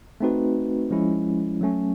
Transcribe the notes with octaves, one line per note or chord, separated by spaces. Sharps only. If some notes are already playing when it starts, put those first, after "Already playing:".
A3 C4 D#4 F#4 B4
F3 G#3 C#4 E4
F#3 A3 C#4